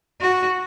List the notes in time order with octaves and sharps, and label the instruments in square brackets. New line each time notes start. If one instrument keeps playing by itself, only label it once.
[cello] F#4